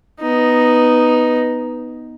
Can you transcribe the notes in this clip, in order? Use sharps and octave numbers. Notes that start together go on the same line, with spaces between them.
B3 D#4